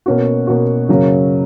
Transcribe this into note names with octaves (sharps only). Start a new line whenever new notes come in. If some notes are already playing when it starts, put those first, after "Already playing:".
B2 A#3 C#4 F#4
B2 A#3 C#4 F#4
F#2 C#3 F#3 A#3 C#4